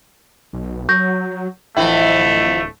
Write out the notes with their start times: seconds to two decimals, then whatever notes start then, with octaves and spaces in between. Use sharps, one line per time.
0.53 B1
0.89 F#3 C#6 G6 A#6
1.77 D1 F2 E3 A3 E4 E5 G5